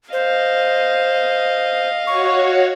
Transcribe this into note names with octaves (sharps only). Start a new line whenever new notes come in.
C5 D#5 F5
F#4 C#5 C#6